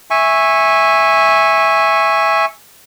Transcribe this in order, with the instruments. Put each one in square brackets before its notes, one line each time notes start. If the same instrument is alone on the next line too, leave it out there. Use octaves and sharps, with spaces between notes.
[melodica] E5 G#5 C#6